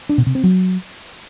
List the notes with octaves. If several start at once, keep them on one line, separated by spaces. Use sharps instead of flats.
D4
B2
C3
C4
F#3